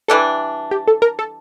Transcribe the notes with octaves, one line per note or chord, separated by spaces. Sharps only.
E3 G3 D4 A4
G4
A4
A#4
A4